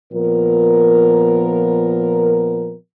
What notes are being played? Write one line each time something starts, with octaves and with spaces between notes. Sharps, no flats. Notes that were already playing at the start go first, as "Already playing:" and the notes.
A#2 F3 B3 A#4